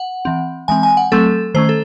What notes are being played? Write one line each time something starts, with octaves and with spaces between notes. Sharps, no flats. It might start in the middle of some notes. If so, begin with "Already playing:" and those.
Already playing: F#5
E3 C4
E3 G#3 C4 G#5
G#5
F#5
F#3 A3 C4 A4
D#3 A3 C#4 C5
A4